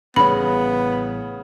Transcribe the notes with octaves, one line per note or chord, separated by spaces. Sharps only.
A1 C#3 G3 B3 C#4 B5